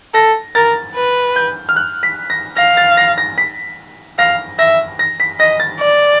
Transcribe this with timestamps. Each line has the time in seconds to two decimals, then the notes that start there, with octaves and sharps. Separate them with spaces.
0.14 A4 A#6
0.55 A#4 A6
0.95 B4
1.36 G6
1.69 F6
1.76 F#6
2.03 B6
2.30 A#6
2.57 F5 A#6
2.77 A6
2.97 A#6
3.18 A#6
3.38 B6
4.18 F5 A#6
4.59 E5 A#6
4.99 A#6
5.20 B6
5.39 D#5 A#6
5.60 A6
5.79 D5